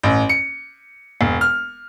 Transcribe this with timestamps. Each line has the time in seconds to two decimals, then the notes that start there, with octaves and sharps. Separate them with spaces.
0.03 A1
0.29 C#7
1.21 E1
1.41 F6